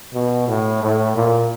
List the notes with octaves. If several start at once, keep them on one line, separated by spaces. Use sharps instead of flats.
B2
A2
A2
A#2